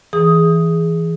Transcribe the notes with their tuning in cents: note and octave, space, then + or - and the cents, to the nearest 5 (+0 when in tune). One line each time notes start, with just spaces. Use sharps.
E3 +0 G#4 +0 D#6 +5